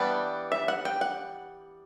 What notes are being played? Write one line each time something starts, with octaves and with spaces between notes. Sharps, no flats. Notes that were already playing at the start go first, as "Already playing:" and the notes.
Already playing: E3 G3 B3 D4 F#5
E5
F#5
G5
F#5